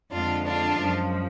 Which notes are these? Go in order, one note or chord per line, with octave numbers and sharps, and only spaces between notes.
F2 D3 G#3 D4 F4
D4 F4
F#2 F3 G#3